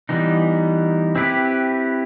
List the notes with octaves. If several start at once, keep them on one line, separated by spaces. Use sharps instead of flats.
E3 G3 B3 D#4
C4 E4 G4 B4